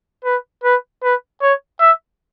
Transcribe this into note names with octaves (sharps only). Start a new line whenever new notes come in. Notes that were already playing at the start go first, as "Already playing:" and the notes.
B4
B4
B4
C#5
E5